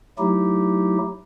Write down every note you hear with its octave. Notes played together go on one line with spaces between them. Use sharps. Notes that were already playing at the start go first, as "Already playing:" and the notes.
F#3 A3 D#4 E4 G4